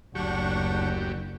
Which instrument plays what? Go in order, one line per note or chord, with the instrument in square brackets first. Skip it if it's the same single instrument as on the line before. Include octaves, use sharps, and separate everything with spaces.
[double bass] F#1 [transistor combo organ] D2 F#3 G4 [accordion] D4 F#5 C#6